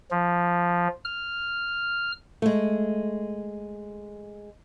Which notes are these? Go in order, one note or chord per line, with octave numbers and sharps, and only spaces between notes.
F3
F6
G#3 A3